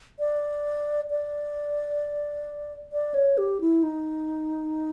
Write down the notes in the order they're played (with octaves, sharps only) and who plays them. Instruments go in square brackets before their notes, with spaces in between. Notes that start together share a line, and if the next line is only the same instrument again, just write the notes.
[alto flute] D5
D5
D5
C#5
G4
E4
D#4